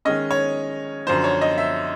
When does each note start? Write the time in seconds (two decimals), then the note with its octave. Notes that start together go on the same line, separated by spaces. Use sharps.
0.05 D#3 G#3 C#4 D#5
0.31 C#5
1.07 F#2 D3 F3 C5
1.24 C#5
1.41 D#5
1.58 E5